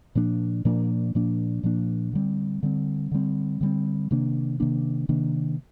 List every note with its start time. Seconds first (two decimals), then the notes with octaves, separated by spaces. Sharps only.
0.15 A#2 F3 A#3 D4
0.65 A#2 F3 A#3 D4
1.15 A#2 F3 A#3 D4
1.63 A#2 F3 A#3 D4
2.13 D3 G3 C4
2.63 D3 G3 C4
3.12 D3 G3 C4
3.61 D3 G3 C4
4.11 C3 D#3 A#3 D4
4.60 C3 D#3 A#3 D4
5.09 C3 D#3 A#3 D4